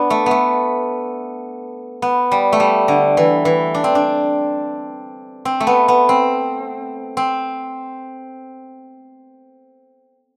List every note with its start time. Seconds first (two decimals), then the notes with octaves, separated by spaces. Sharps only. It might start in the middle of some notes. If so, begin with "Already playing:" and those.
Already playing: B3 D4
0.10 A3
0.26 A3 B3
2.02 B3
2.31 G3
2.52 A3
2.60 G3
2.88 D3
3.17 E3
3.45 E3
3.74 D4
3.84 C4
3.95 D4
5.45 C4
5.60 A3
5.67 B3
5.88 B3
6.09 C4
7.17 C4